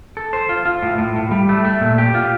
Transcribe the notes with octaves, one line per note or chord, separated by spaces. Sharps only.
A4
C5
F4
F4
A2
A2
A2
G3
A3
A3
A#2
G4
F4